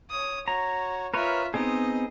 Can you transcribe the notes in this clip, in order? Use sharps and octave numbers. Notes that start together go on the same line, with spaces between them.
C#5 D#6
F#4 C#5 A#5
F4 A#4 B4 C#5 E5
B3 C4 D#4 G#4 D#5